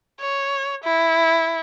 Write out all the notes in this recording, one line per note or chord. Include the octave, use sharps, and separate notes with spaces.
C#5
E4